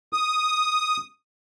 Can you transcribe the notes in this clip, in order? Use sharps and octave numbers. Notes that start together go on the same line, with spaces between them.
D#6